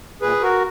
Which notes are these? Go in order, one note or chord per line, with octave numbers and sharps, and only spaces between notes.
A#2 G#4 B4
F#4 A#4